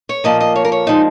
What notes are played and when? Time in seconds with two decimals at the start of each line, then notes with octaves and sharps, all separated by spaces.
0.09 C#5
0.24 A#2 F3 A#3 D#5
0.40 D#5
0.56 C#5
0.65 A#4
0.72 C#5
0.87 A#2 F3 G#3 D#4